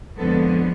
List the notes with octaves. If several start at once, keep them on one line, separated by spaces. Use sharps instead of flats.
F2 D3 F3 G#3 B3 A4